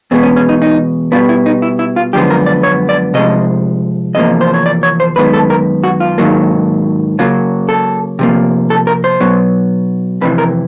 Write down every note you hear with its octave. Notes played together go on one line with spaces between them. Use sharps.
E2 B2 G#3 B3 C4
C#4
C#4
D#4
D#4
B2 G3 B3 F4
E4
D#4
E4
E4
F4
F#2 D3 F3 G#3 B3 G4
A#4
D5
C#5
D5
C3 F3 G#3 D#5
E2 C3 F3 A#3 D#5
C5
C#5
D5
C#5
C5
F#2 D#3 G#3 B3 B4
A4
A#4
F#4
F4
G#2 D#3 F#3 A#3
C#3 F#3 A#3 F4
A4
C3 F3 A#3
A4
A#4
C5
B2 F#3 B3
F2 C3 E3 B4
A#4